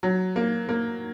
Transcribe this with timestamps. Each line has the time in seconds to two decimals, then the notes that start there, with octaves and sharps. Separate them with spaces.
0.03 F#3
0.36 A#3
0.69 A#3